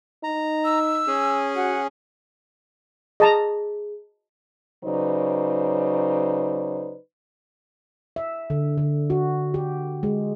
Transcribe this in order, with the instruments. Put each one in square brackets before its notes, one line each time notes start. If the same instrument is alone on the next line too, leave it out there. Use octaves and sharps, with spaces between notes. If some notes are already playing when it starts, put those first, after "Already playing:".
[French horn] D#4 [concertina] A#5
[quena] E6
[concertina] C#4 G#4
[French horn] F#4 [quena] F#5
[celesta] G#4 [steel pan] D#5 A5 A#5
[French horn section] C#3 F#3 D#4 B4 C5 D5
[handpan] E5
D3
D3
F#4
G4
G#3